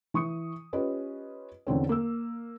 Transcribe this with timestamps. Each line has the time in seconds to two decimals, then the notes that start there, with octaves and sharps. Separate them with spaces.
0.14 E3 C#6 D#6 C#7
0.73 C#4 F4 G4 B4 D#5
1.67 E2 D3 C4 C#4
1.89 A#3 E6